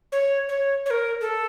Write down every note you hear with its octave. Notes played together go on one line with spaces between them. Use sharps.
C#5
C#5
C#5
A#4
A4